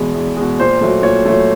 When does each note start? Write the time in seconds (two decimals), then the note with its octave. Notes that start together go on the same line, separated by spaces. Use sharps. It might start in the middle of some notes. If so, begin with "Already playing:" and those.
Already playing: E2 B2 G#3
0.14 E2
0.36 B2 G#3
0.59 A#2 C5
0.81 F#3 A3
1.03 A#2 C#5
1.25 F#3 A3